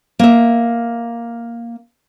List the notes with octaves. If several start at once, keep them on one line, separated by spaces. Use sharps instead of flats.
A#3 E5